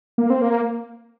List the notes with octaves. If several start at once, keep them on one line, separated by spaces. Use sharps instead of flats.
A#3
C4
A#3